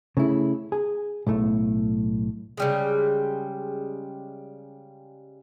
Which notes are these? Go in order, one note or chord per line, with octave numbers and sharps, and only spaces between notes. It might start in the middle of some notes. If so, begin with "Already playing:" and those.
C#3 A3 E4
G#4
B1 A2 A3
C#3 G3 G#3